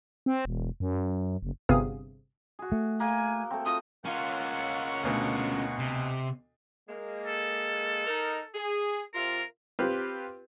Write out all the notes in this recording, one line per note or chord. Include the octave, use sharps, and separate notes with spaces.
C4
E1
F#2
F#1
G1 C3 B3 G#4 F5 D#6
F#4 G#4
A3
A#3 G#5
A3 C4
C4 F4 D#6
A#3 C#4 F4 C#5 F#5
D2 B2
C3
G#3 A#3
A4
D#4 A#4
G#4
C3 F4 A#4
C4 F4 G4 B4